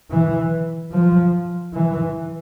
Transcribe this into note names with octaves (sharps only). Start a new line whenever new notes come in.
E3
F3
E3